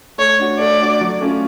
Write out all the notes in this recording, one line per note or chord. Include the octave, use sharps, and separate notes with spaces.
A3 C#5
D4 F#4
A3 D5
D4 F#4
F#3
A3 C#4 F4